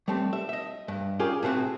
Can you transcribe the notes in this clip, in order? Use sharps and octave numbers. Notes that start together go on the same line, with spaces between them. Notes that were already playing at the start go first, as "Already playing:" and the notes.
G3 A3 C4
E5
D#5 E5
G2
C#4 F4 G4 G#4 A#4
A2 C3 C4 F#4 G#4